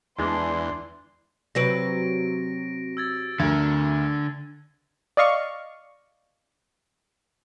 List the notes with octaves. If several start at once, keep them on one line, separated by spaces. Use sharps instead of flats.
E2 E3 G#3 D4 C6
C3 F#3 B4 A#6 D7
E6 G#6 A6
D2 D3 A3 D4 A#4 G#6
D5 D#5 F5 C#6